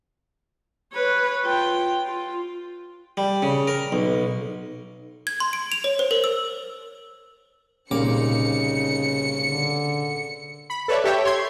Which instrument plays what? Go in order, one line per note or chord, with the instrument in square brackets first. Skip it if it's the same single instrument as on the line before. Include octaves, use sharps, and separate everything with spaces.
[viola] B4 C#5
F4 G5
F4
[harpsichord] G3
C#3
A#4
B1
[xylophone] G#6
C6
D7
F7
C#5
C5
A#4
E6
[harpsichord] C2 A#2 D6 [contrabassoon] C#3 [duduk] D#4 [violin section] C#7
[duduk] D3
[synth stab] B5
A4 B4 C#5 D5 E5
G4 A4 C#5 E5 G5
C#5 C6 G#6